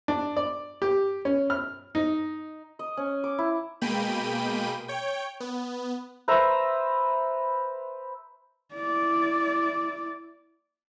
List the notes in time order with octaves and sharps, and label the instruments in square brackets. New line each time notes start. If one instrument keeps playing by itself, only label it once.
[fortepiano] D4
D5
G4
C#4
F6
D#4
[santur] D#5
C#4
D6
E4
[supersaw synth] B2 G#3 A#3 G5 B5 D#7
C#5 G5
B3
[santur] B4 C5 E5 A#5
[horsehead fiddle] E4 D5